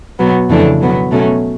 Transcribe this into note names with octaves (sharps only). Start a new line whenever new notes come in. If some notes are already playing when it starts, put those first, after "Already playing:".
B2 F#3 B3
F2 C#3 E3 A3 D4
B2 F#3 B3
B2 F#3 A3 C#4